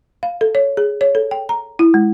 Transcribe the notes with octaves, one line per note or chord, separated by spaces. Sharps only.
F5
A4
C#5
G#4
C#5
A4
G5
A#5
E4
G#3